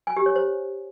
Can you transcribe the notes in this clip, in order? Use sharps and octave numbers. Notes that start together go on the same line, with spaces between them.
G#5
G4
C#5
C5